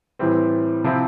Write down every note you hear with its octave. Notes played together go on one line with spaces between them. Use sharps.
A2 E3 G3 C4
C3 F3 C4 E4